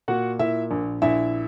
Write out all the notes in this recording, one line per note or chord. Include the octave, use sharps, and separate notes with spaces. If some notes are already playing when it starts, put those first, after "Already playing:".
A#2 F#4 F#5
A#2 E4 E5
A#1
A#1 E4 E5